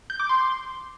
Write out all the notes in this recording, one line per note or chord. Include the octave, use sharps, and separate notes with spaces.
G6
D6
C6